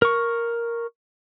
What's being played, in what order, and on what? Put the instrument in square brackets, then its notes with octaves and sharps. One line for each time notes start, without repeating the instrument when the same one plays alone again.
[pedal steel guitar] A#4 C#6